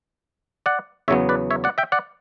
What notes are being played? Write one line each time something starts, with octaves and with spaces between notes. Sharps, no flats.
D5 F#5
E2 C#3 F#3 B3 C#5 E5
B4 D5
C#5 E5
D5 F#5
E5 G5
D5 F#5